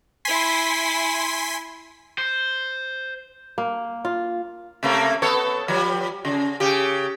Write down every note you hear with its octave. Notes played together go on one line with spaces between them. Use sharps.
E4 G#5 C6 B6
C5
A#3
F4
C3 A3 A#3
B3 A4 C#5
F3 G3
C#3
C#3 G4